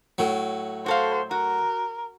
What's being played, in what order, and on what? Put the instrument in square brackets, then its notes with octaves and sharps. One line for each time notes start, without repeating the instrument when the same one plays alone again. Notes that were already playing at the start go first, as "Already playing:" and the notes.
[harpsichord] A2 F#3
[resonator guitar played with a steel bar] F#4 A4 F5 [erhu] C5
[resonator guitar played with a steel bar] F#4 [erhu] A#4